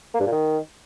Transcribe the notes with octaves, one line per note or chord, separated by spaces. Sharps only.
A#3
G2
A#2
D#3